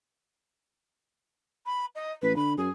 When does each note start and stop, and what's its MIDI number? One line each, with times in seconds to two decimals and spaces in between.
1.65 1.85 83
1.95 2.11 75
2.22 2.35 33
2.22 2.34 71
2.36 2.53 50
2.36 2.52 83
2.57 2.69 42
2.57 2.71 68